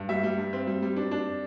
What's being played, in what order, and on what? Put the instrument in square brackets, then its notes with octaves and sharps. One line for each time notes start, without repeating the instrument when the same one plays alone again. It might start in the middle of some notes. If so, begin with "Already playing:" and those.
Already playing: [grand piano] G2
G3 E5
G3
G2
C4
G3
G3
D4
D4